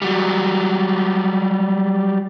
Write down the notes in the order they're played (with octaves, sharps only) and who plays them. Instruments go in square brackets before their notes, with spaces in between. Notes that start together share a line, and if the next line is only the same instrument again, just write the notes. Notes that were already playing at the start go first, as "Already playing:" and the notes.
[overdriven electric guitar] F#3 G3